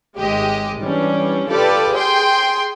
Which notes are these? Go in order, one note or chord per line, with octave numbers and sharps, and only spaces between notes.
G#1 G#3 G4 D#5
E3 G3 C#4 D4
F4 G4 A4 B4 D5
G#4 G5 C6